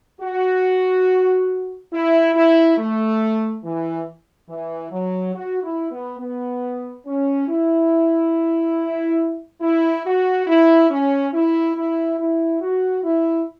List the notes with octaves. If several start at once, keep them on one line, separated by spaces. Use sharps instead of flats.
F#4
E4
E4
A3
E3
E3
F#3
F#4
E4
B3
B3
C#4
E4
E4
F#4
E4
C#4
E4
E4
E4
F#4
E4